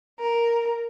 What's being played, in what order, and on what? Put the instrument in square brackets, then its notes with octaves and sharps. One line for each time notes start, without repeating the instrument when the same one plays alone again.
[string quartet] A#4